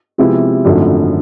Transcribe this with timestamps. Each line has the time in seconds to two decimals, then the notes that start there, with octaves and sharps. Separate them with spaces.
0.18 C3 F3 G#3 B3 E4
0.65 G#1 F#2 D3 F3 A3